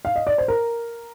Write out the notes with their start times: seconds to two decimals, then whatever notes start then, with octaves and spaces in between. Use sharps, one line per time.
0.05 F5
0.16 D#5
0.27 D5
0.38 C5
0.48 A#4